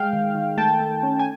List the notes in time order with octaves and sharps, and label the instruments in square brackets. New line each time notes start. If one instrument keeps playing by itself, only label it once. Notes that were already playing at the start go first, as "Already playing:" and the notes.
Already playing: [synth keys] G#3 F5 G5
D#3
D#3
A3 G5 A5
A3
C#4
G#5